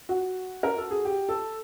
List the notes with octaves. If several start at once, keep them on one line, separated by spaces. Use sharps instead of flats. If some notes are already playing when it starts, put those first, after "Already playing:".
F#4
A#4
A4
G#4
G4
A4